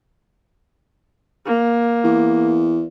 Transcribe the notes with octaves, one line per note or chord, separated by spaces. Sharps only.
A#3
E2